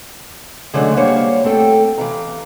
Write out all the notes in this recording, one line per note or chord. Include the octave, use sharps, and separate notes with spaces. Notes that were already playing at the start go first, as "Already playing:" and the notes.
D3 F#3 G#3 A3 C#4 D4
G3 A#3 C5 C#5 F5 F#5
A3 C4 A4 G5
E3 F5 A#5